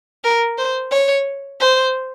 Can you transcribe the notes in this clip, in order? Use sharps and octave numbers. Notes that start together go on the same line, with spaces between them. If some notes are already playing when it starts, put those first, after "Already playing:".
A#4
C5
C#5
C5